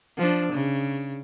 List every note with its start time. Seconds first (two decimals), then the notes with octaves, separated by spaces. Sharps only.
0.18 F3 D4
0.53 C#3